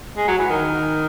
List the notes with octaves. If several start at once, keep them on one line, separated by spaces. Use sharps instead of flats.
G#3
F#3
E3
D#3